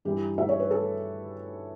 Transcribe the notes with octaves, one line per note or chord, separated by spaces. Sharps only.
G2 E3 G4
E5
C#5
B4
A4